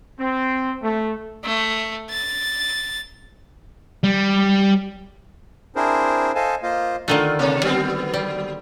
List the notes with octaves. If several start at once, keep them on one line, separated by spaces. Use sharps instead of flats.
C4
A3
A3
A6
G3
C4 D4 E4 G#4 A#4 C5
A4 C5 D#5 F5 G#5 A5
A#3 F4 C5 D#5 F5
D3 D#3 A3 F4
C3 A#3 A4
F#3 B3 C4
G3